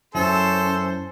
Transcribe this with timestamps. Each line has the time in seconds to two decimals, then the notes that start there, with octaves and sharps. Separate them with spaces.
0.15 F#2 C#4 E4 A4 C5